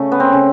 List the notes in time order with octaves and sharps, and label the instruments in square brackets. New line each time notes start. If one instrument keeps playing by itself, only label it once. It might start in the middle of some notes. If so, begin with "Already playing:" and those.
Already playing: [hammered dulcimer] C#3 A3
B3
C4
C#3